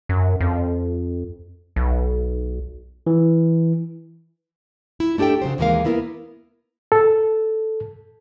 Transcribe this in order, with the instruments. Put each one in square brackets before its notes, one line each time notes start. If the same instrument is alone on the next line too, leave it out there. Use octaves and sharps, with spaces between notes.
[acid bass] F#2
F2
B1
[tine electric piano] E3
[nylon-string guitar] E4
A3 D4 G4 A4 G5
C#3 F#3 C5
D#2 E3 G#3 A#3 A#4 F5
A#3 B3 E4 A#4
[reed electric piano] A4